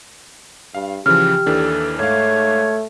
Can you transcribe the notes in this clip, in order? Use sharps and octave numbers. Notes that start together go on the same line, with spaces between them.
G2 F5
C#3 E3 F3 G4 F6
D#2 E3 D4 A4
G#2 A3 C#5 F5